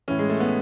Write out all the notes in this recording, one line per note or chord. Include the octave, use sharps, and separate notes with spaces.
A2 E3 C#4
G#3
A3
B3